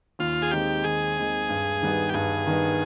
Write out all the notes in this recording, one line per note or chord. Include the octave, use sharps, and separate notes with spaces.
D#2 F4
G#4
D#3 G#3 C4 D#4 G4
D#2 G#4
D#3 G#3 C4 D#4
G2
D#3 G3 B3
G4
G2 G#4
D#3 G3 B3